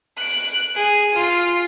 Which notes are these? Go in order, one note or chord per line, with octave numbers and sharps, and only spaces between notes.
F#6 D7
G#4
F4